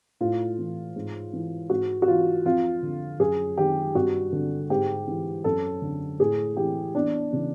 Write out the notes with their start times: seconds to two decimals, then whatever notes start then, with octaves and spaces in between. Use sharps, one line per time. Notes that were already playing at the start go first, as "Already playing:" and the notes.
0.20 A2 F4
0.58 E3
0.96 G#2
1.33 E3
1.70 G#2 F#4
2.02 F#4
2.07 E3 F4
2.45 F2 F4
2.82 D3
3.19 F#2 G#4
3.58 D#3 G4
3.95 G2 F#4
4.32 D3
4.70 G#2 G4
5.08 E3
5.44 F#2 A4
5.82 D3
6.19 A2 G#4
6.57 E3 G4
6.95 E2 D4
7.32 C#3 E3